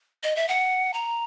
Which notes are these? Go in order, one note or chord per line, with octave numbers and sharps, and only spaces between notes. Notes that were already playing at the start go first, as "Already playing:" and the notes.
D#5
E5
F#5
A#5